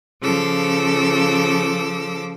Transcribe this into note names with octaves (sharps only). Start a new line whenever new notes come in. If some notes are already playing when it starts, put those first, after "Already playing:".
C#3 F3 A4 D6 E6